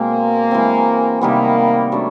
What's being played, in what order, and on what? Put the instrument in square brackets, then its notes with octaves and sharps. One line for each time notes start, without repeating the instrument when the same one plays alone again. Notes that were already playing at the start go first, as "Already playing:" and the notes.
Already playing: [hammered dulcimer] B2 G#3 C4 [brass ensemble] A#3
[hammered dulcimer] E3 G#3 C4
[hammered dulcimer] C3 D#3 G3 B3 [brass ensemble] A#3
[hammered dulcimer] F#3 A3 D4